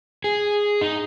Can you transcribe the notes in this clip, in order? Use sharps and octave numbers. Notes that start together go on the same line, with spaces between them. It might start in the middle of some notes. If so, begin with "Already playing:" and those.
G#4
D#4